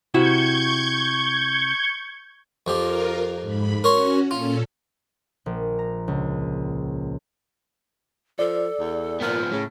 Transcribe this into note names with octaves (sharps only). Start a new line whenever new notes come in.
C3 E4 F#4 C#6 G6 G#6
F2 F3 F4 G4 A#4
G#2 B5
C#4 F#4 A#4 C#5 C6
A#2 C#4 F4 A4
A#1
A#5
C#2
F3 A4 D5
E2
A#2 F3 B3 F6
A2 C#3